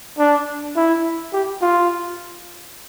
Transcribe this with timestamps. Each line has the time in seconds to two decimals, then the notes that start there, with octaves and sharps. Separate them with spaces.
0.18 D4
0.76 E4
1.33 G4
1.62 F4